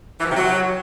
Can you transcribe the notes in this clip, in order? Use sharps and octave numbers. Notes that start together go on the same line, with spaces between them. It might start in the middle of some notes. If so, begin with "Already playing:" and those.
E3
F3
C3
F#3